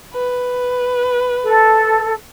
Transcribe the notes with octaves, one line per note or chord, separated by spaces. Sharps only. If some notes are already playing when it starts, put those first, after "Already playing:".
B4
A4